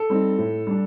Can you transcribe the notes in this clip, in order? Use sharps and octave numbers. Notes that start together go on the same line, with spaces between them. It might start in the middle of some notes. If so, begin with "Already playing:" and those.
Already playing: A4
G3 C4 D#4
A2
G3 D4